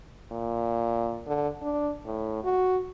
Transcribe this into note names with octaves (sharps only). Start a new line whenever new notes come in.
A#2
D3
D4
A2
F#4